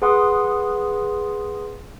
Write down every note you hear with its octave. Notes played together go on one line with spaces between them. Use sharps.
G#4 B4 F#5 C6 D#6